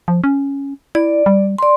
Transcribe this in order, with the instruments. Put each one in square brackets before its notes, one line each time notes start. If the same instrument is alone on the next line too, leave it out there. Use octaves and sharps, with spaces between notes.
[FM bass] F3
C#4
[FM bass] E4 [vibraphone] D5
[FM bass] G3
[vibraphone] D5 C6